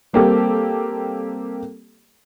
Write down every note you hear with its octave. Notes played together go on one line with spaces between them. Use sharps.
G3 A#3 C4 G4 A4